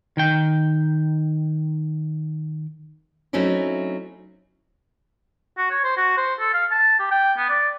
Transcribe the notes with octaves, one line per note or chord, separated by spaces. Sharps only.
D#3 G5
F#3 A3 C4 C#4 D#4 E4
F#4
C#5
C5
F#4
C5
A4
F5
A5
G4
G5
B3
D5